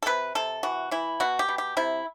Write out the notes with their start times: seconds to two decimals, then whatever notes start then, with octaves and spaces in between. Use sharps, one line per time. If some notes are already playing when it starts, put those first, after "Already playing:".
0.03 A4
0.06 C3 B4
0.35 C3 A4
0.63 E3 F#4
0.91 E3 E4
1.20 B2 F#4
1.39 G4
1.49 B2
1.58 G4
1.77 C3 E4